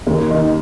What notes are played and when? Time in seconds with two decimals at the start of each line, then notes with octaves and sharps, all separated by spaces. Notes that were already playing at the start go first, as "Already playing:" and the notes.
0.07 D#2
0.30 D#3